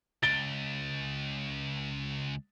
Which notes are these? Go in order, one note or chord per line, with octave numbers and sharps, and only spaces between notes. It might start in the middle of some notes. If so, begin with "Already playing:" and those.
C#2 A6 D7 G7